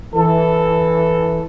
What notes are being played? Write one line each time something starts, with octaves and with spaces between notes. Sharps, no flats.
E3 A4